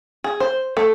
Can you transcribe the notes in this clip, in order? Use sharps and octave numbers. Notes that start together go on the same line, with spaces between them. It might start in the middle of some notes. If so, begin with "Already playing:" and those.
G#4
C5
A3